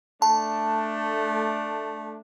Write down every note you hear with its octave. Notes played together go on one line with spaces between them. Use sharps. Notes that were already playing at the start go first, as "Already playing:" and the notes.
A3 D4 A5